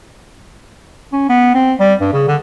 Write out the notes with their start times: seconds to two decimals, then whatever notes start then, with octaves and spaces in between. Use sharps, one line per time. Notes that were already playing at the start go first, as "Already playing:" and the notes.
1.12 C#4
1.29 B3
1.54 C4
1.80 G3
2.00 G2
2.13 C#3
2.28 D3